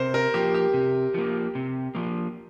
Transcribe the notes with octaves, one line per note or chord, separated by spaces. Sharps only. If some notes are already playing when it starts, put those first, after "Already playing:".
Already playing: C3 A#4 C5
A#4
F3 A#3 G4
G4
C3
F3 A#3
C3
F3 A#3